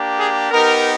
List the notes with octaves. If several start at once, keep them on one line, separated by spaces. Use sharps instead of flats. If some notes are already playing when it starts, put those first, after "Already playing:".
Already playing: A#3 D4 G4
G#4
B3 D#4 G4 A#4